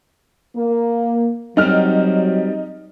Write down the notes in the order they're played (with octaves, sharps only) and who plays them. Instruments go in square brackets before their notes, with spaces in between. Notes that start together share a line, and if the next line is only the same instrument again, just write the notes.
[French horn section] A#3
[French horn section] F#3 [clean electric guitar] G3 C4 [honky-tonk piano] D#4 F6